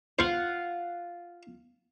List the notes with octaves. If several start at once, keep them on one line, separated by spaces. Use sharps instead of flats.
F4 C5 F5 F#5 C#6